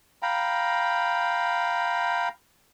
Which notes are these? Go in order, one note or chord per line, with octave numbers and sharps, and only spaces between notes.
F5 G5 A#5 B5